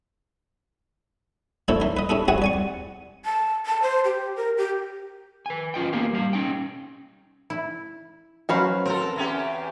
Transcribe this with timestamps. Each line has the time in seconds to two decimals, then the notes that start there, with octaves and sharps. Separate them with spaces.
1.68 D3 F3 A#3 E4 A4 C#5
1.81 E3 A#4
1.97 B4 D#5
2.09 C#4 E4 G#4 A4
2.28 C4 E4 F#4 G#4 F#5 G#5
2.42 D5 G#5 C#6
3.25 A5
3.66 A5
3.82 C5
4.05 G4
4.37 A#4
4.58 G4
5.46 B4 G#5
5.74 C#4 F4 D#5 G5
5.93 A#3 B3 G4 A#4 F5
6.13 G3 F5
6.33 C#4 D#4 G5
7.50 E4
8.49 F#3 C#4 F#4 B4 C5 F5
8.86 C4 A4 A#4
9.16 E2 C#4 G4